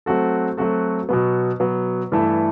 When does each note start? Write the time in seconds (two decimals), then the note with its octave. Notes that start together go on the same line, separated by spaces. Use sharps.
0.06 F#3 A3 C4 F#4 A4
0.57 F#3 A3 C4 F#4 A4
1.09 B2 F#3 B3
1.60 B2 F#3 B3
2.12 G2 E3 A3 E4 A4